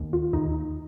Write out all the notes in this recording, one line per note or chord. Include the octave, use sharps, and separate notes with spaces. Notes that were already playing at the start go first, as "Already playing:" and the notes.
Already playing: D#2
F4
D#2 D#4